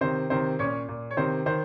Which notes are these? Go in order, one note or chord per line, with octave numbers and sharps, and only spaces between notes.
C3 D#3 C5
C3 D#3 C5
A#2 C#4 C#5
A#2
C#5
C3 D#3 C5
D#3 C5